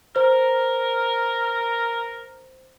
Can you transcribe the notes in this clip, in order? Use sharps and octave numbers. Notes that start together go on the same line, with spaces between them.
A#4 C5